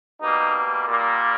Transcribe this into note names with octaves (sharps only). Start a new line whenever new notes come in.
B2 G3 A#3 D#4
A#2 G3 A#3